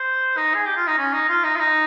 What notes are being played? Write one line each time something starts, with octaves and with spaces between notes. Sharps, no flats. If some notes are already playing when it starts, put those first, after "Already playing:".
Already playing: C5
D#4
G#4
G4
F4
D#4
C#4
D#4
F4
D#4
F4
D#4